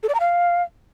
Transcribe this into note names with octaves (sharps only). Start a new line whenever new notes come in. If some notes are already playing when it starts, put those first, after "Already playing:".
A4
D5
A#5
F5